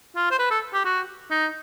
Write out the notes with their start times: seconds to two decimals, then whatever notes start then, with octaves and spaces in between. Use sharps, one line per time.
0.16 F4
0.31 C5
0.39 B4
0.51 A4
0.74 G4
0.85 F#4
1.30 D#4